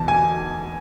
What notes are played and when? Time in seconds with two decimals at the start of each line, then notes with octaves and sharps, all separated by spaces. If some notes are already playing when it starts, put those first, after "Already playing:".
Already playing: E2 B2 A5
0.08 G#5